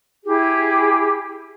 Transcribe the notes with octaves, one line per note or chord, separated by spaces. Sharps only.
E4 G4 G#4